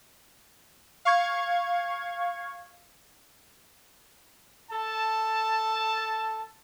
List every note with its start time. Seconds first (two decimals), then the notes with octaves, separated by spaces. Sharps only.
1.05 F5 C#6 G#6
4.71 A4 A5